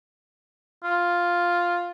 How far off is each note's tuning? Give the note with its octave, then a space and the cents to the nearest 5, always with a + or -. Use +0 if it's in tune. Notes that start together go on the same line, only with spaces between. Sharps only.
F4 +5